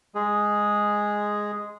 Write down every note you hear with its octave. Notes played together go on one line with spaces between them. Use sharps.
G#3 G#4